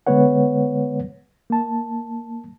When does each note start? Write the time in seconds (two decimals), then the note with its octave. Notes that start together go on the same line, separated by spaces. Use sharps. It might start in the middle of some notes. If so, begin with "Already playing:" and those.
0.07 D3 G#3 B3 B4 C#5 F#5
1.50 A#3 A5